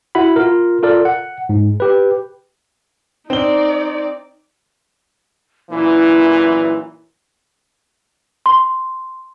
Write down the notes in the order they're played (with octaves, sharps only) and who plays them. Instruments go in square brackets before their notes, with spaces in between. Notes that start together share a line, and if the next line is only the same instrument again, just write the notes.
[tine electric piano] E4 F#4 F#5 B5
F4 A#4
F4 A4 A#4 D5
F#5
G#2
G4 B4
[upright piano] C4 G7 [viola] D#4 D5
[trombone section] F#2 A#2 E3 [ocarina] E4
[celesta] C6